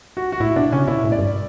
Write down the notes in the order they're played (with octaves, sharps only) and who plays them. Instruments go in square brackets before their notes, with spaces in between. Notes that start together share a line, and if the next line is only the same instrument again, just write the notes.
[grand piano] F#4
F#4
[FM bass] A2 [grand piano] E4
[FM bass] B2 [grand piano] D4
[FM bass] C#3 [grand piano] C#4
[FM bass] B2 [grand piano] E4
[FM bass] A2
[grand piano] D5
[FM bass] G2